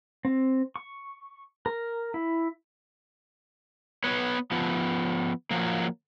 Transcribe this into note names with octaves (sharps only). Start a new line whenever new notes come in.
C4
C#6
A#4
E4
B3 B4 C#5
F3 B3
F3 F#3 A#3